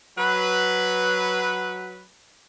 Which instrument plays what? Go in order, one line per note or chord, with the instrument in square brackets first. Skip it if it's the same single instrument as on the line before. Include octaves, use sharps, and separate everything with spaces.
[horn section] F#3 B4